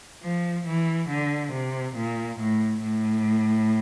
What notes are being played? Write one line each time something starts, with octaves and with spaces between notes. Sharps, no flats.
F3
E3
D3
C3
A#2
A2
A2